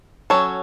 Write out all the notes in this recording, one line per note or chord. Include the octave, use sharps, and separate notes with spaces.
F#3 C#4 A4 C#5